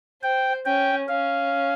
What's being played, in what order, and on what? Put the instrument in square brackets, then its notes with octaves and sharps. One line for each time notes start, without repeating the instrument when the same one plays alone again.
[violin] C5 [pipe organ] G5
[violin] C#4 [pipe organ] G5
[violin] C#4 [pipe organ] F5